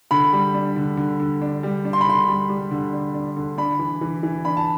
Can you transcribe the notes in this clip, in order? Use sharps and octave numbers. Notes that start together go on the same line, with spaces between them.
D3 B5
G3
D4
D3
D3
D3
D4
G3
D4
C6
B5
D3 C6
G3
G3
D3
D4
D4
D3
D4 B5
E3
E3
E3
D4 B5
A5